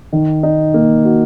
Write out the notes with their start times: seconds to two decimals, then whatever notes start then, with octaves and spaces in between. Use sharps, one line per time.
0.13 D#3
0.43 D#4
0.74 A#3
1.05 F#4